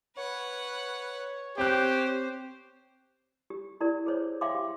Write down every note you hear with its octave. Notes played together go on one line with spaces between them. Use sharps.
B4 C#5 F#5
C4 G4 C5 F#6
G4
E4 G4 A#4 D5
G#4 C5 C#5
E5 F5 G5 C6 D6
G4